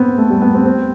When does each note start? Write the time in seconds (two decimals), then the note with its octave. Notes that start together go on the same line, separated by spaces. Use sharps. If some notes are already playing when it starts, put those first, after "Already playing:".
Already playing: B3 C4
0.18 A3
0.30 G3
0.42 B3
0.54 C4
0.66 C4